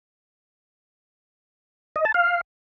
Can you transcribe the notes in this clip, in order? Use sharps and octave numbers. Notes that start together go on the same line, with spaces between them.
D#5
A5
F5